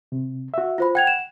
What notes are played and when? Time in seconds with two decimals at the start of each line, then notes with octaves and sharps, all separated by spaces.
0.12 C3
0.54 F#4 E5
0.78 F4 C5 B5
0.95 F#5 G5 G#6 F7
1.07 E7